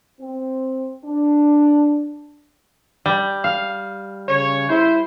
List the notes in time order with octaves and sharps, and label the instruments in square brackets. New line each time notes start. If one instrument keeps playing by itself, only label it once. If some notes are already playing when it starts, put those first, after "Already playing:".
[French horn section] C4
D4
[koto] G3
F5
[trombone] C#3 [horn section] C#5
[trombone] E4 [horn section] C5